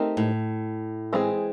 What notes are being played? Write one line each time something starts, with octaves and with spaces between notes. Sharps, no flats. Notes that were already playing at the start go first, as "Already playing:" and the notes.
Already playing: A3 C4 D#4 G4 A#4
A2
E3 G#3 C4 F4 G#4